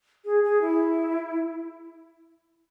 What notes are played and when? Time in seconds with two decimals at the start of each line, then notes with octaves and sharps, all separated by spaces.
0.25 G#4
0.44 G#4
0.62 E4